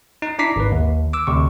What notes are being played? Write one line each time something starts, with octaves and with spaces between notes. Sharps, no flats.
D#4
D4 E4 A#5 D6 B6 C7
G#1 B4
D#2
D6 E6
D2 C3 C#6